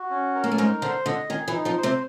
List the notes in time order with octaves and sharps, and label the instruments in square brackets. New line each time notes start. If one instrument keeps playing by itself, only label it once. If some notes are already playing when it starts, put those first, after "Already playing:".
Already playing: [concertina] F#4
C#4
A#4
[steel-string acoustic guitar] A#3
A3
[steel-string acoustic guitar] G#2 G#3 [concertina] D#4
[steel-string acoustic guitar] D3 D4 [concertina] C5
[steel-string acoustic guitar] D3 D4 [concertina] D#5
[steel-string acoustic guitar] D#3 D#4 [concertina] G#4
[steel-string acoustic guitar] E3 E4
[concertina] D#4
[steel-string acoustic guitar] F3 F4
[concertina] C5
[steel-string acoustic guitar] C3 C4